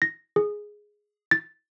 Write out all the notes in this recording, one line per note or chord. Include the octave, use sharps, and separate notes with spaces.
A#6
G#4
A6